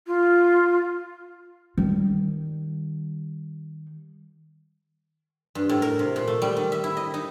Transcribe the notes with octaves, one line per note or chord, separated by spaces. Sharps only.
F4
D#3 G3
G2
A2
A#4
C3
A#2
A3
G3
D#3
E5
E4
D#5
D#4